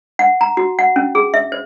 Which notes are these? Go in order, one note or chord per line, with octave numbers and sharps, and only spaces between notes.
F#5
A#5
F#4
F#5
C#4
G#4
E5
C5